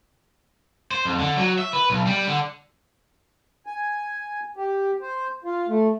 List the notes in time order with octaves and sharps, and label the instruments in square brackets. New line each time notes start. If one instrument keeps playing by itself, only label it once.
[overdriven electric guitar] C5
F2
D3
F#3
E5
B4
B1
G3
D3
[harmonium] G#5
G4
C5
F4
A3